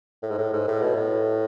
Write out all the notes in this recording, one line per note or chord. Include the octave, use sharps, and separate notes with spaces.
A2
G#2
A2
G#2
A2
B2
A2